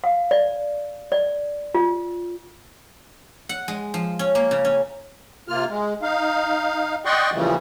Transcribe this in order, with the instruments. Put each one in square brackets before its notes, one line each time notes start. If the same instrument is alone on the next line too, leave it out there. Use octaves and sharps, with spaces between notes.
[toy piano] F5
D5
D5
F4
[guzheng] F#5
G#3
F3
C#4
A#3
C#3
C#4
[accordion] C3 A#3 F4 F6
G#3
D#4 F5
D5 D#5 F#5 G5 C6 C#6
A#2 C#3 E3 F3 G3 A3